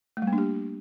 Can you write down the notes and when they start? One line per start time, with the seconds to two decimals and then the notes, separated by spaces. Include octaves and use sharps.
0.17 A3
0.22 G3
0.27 A#3
0.33 D4
0.38 G4